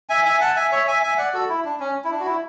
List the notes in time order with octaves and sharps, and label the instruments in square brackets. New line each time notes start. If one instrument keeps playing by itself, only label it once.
[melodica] E5 G#5
E5 G#5
F#5 A5
E5 G#5
C#5 E5
E5 G#5
E5 G#5
D5 F#5
F#4 A4
E4
D4
C#4
E4
D4
F#4
E4